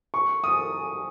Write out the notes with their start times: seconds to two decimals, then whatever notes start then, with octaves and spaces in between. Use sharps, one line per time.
0.14 C#6
0.44 D#6